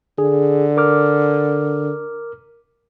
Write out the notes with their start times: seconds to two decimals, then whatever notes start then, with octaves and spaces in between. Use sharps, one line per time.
0.18 D3 G#4
0.77 A#4 D6 F6